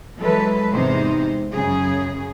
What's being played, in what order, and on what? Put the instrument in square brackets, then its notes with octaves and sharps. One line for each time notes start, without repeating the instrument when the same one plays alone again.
[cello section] E3 F#3 G#3 A4 B4
E2 G#2 C3 G#3 D#4 C5
F#2 C#3 G#4